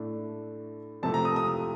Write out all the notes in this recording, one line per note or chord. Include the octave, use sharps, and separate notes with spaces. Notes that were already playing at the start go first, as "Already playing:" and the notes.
Already playing: A2 A3 D4
F2 C3 F3 A3 C4 A5
A#5
D#6
D#6